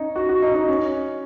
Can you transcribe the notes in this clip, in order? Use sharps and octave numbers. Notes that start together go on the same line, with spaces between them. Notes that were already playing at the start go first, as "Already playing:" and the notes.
Already playing: C#4 D#4
F#4
F#4
D#4
D#4
C#4